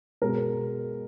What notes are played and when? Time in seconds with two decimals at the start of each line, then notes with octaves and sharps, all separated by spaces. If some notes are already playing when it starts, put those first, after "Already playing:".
0.22 B2 G#3 A#4